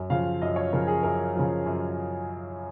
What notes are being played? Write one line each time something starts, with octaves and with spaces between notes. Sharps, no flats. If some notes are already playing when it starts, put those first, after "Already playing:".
Already playing: F#2
C#3 F3 F5
F#2 D#5
C#5
C#3 F3 A#4
G#4
F#2 A#4
C#3 F3
F#2